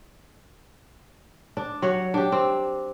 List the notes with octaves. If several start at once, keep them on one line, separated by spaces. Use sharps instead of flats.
D4
F#3 C#5 F#5
D4 G4
C4